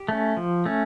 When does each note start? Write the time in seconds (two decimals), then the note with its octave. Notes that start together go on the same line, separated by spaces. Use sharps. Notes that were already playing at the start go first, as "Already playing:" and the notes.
Already playing: G4
0.09 A3 C#4
0.37 F3
0.65 A3 C#4